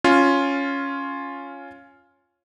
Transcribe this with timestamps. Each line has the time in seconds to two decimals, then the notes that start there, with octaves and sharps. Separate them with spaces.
0.04 C#4 F4